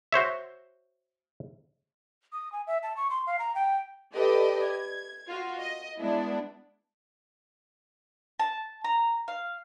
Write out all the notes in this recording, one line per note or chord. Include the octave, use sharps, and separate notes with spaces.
F#4 C5 C#5 E5
D#6
G#5
E5
A5
C#6
C6
F5
A#5
G5
G4 A4 B4 D5 D#5 G5
G#6
F4 F#4
D#5
G#3 B3 D4 E4
A5
A#5
F5